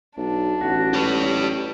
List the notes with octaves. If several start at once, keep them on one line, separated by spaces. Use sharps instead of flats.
B1 D4
A1 F#4
G4 A4 B4 C#5 D5